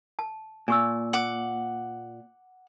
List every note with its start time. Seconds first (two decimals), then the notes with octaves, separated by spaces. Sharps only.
0.19 A5
0.68 A#2 G#5 C#6 E6
1.13 F#5 D6